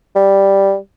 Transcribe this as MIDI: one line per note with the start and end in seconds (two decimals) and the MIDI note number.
0.16 0.76 55